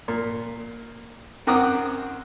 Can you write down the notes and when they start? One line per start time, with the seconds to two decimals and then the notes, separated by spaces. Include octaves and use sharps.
0.08 A#2
1.47 F#2 C4 A#4 F#5 D6 D#6